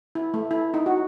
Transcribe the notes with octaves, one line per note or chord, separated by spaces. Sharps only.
E4
A3
E4
D#4
F#4